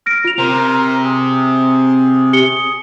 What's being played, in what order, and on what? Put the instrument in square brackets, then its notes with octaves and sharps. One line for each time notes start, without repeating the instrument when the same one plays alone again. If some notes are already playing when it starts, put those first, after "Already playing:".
[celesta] F6 A#6 D7
F4 F7
[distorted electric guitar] C3 [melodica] A#4 C5 A#5
[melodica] G#4
[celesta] G4 C#7 G7